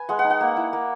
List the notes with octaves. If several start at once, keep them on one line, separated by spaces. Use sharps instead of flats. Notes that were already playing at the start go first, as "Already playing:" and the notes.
Already playing: B4 G#5
G#3 F#5
F#5
D#4
F#5
A#3
E4
A#3